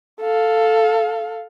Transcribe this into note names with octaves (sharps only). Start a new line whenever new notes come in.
A4 F5